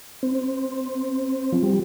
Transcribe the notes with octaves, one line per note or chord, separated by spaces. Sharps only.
C4
F3
G3